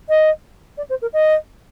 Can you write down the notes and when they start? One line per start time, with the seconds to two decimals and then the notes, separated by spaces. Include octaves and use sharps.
0.09 D#5
0.77 D5
0.90 C5
1.02 A#4
1.13 D#5